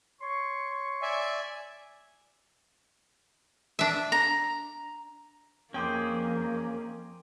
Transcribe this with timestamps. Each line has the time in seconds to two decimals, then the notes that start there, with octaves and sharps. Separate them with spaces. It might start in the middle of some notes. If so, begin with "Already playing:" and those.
0.21 C#5 C6 C#6
1.02 D5 E5 G#5
3.79 D4 E5
4.12 A#5
5.74 F2 A#3 C#4 G#4 C5 G5 C6 D6